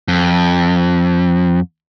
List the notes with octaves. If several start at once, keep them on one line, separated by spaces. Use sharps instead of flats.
F2